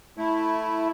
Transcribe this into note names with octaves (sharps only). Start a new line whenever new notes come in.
A3 E4